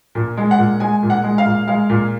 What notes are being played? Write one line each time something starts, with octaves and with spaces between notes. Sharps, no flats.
A#2
G#3
F#5
A#2
G#3 G#5
A#2
F#5
G#3
F5
A#2
G#3 F5
A#2